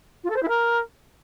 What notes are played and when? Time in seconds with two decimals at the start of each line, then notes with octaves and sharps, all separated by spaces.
0.24 F4
0.30 A4
0.36 C5
0.43 E4
0.49 A#4